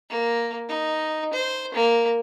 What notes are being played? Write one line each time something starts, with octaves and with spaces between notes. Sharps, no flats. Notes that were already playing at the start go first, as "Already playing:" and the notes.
A#3
D#4
C5
A#3